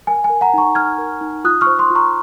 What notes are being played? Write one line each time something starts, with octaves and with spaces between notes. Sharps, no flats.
A#4 G#5
G#5
A#4
F#5 A#5
D#4 A#5 C#6
D#4 F6 G#6
A#4
D#4
F4 D#6 F#6
C#6 F6
C5
C6 D#6
F4
A#5 C#6